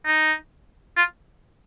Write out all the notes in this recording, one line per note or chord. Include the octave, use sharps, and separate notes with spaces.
D#4
F4